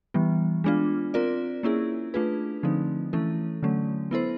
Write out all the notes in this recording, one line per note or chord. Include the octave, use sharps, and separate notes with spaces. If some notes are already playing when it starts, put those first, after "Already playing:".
E3 G3 B3
G#3 B3 D4 F4
C4 F4 A#4 D5
A#3 C#4 E4 G#4
A3 D4 F4 G#4 B4
D3 F3 A3 C4 D#4
E3 A3 C#4 E4 A4
D3 F#3 A3 C#4
B3 E4 A4 C5